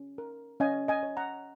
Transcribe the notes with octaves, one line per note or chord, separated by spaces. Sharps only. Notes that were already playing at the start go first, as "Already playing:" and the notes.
Already playing: C#4
A#4
C#4 D#5 G#5
D#5 G#5
C#5
F#5 A#5